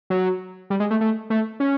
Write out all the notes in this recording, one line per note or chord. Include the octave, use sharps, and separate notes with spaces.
F#3
G3
G#3
A3
A3
A3
C#4